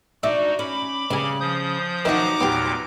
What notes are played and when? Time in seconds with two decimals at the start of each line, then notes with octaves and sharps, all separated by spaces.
0.23 D4 D#4 F#4 E5
0.59 C#4 B5 D6
1.11 G2 C#3 G#5
1.40 F3 D#6 G6
2.05 F2 D#3 E3 F#3 D#4 F#4 A#5 D6
2.41 E2 A#2 B3 G4 C6